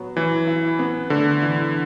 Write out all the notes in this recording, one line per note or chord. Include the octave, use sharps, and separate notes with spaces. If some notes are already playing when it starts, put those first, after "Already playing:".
Already playing: F#3 B3
E3 F#3
E4
B3
D3 A3
E3